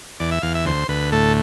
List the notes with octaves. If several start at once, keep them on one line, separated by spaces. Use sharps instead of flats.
E2 D5
E5
E2 F5
E5
D2 C5
D2 B4
A2 A4